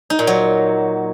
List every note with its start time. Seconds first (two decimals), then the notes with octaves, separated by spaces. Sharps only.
0.10 D#4
0.19 A#2
0.27 F#3